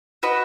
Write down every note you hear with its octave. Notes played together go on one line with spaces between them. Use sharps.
F#4 B4 D#5